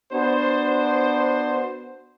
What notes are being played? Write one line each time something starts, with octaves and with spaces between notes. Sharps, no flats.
B3 D4 F#4 C5